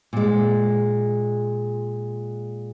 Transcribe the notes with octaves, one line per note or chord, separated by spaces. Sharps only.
A#2 G#3